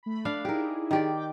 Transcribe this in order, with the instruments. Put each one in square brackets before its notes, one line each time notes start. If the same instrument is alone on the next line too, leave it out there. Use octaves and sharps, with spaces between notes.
[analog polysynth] A3 B5
[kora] D4 F5
[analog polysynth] D#4 E4 G#4 [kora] G4 A#4
[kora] D#3 G4 D5
[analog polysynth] G5 D6